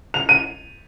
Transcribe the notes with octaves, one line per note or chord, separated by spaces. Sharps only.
F7
D#7